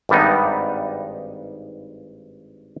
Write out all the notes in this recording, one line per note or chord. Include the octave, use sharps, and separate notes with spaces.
G#1 G2 G3 B3 D#4